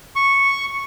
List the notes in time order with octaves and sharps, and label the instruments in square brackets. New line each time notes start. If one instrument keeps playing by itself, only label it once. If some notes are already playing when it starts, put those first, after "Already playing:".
[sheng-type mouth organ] C#6